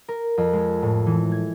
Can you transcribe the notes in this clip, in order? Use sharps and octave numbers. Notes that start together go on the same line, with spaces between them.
A#4
F2
G#3
A2
E3
G#6